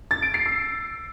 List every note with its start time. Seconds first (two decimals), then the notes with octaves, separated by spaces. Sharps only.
0.11 A6
0.22 D7
0.34 C7
0.46 E6